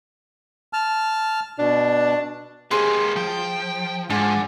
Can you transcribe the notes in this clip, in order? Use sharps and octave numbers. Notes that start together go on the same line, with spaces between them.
A5 F6
B2 D4
A#3 G4 G#4 B4 C5 D#5 C6
F3 G5
G#2 F3 D4 F#5 G#5 D6